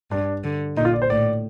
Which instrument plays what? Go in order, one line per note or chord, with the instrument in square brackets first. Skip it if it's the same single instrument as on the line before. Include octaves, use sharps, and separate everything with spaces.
[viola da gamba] G2 [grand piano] D4
[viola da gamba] D3
[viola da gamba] A#2 [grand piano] D#4
[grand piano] F4
D5
C5
[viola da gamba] A2 [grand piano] D5